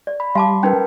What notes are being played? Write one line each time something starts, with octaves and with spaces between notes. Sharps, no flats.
D5
B5
G3 F5 A5 C6 D6
C#4 D#4 A#4 B4 G5